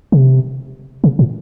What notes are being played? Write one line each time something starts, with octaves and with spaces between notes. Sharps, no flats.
C3
C3
A2